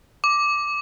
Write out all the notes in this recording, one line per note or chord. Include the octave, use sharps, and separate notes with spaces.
D6